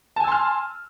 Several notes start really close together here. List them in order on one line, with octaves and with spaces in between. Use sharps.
A5 G#5 E6 C6 F6